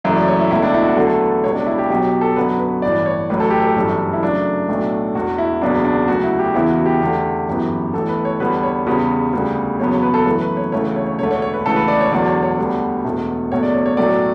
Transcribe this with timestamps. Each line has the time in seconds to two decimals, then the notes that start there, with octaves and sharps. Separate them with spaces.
0.04 F#1 F#2 E3 A3 E4
0.16 D5
0.28 C#5
0.39 E4
0.51 C#2 B2 A3 E4
0.62 D4
0.74 E4
0.85 F#4
0.97 E2 D3 F#3 A3 A4
1.21 B4
1.44 C#2 B2 G3 C#5
1.55 D4
1.66 E4
1.78 G4
1.90 B1 B2 F#3 G4
2.05 C#5
2.21 A4
2.36 F#2 D3 F#3 B3 B4
2.59 B4
2.82 A1 G2 E3 D5
3.06 C#5
3.30 A1 A2 F#3 B4
3.40 A4
3.50 G4
3.60 A4
3.76 G1 F#2 E3 G3
4.13 E4
4.22 F#2 C#3 F#3 A3 D4
4.69 B1 A2 F#3 A3
5.15 E1 E2 B2 F#4
5.38 E4
5.62 F#1 E2 C#3 F#3 B3 D4
5.85 D4
6.08 D2 C#3 F#3 F#4
6.23 E4
6.39 G4
6.54 E2 C#3 E3 B3 E4
6.69 F#4
6.86 G4
7.00 E2 D3 A3
7.48 G1 F#2 E3 B3
7.94 A1 A2 E3 B3 A4
8.09 B4
8.25 C#5
8.40 E2 D3 G3 B3 B4
8.63 C#5
8.87 E2 C#3 G3 B3
9.33 D2 C#3 G3 B3
9.79 F#1 E2 C#3 F#3 B3 C#5
9.91 C#5
10.03 B4
10.14 A4
10.26 F#2 E3 A3 B4
10.41 B4
10.57 C#5
10.72 D2 C#3 E3 A3 C#5
10.96 C#5
11.07 C#5
11.19 E1 D2 D3 A3 C#5
11.31 C#5
11.42 C#5
11.54 B4
11.65 E1 D2 C#3 E3 A3 A4
11.76 B4
11.88 D5
12.01 C#5
12.11 E1 E2 D3 F#3 D5
12.27 C#5
12.43 C#5
12.58 D2 D3 G3 B3
13.05 E1 E2 B2 A3
13.51 F#1 E2 B2 A3 C#5
13.63 D5
13.74 C#5
13.86 C#5
13.97 B1 A2 F#3 A3 D5